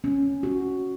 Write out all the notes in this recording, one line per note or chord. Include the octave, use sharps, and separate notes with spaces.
C#4
F#4